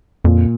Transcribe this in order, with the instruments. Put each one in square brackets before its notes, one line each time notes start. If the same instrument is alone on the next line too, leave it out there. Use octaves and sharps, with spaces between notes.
[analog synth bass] F2 [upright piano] A#2